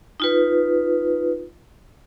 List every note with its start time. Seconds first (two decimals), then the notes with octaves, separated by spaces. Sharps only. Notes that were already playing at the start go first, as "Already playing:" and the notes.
0.20 D#4 F4 B4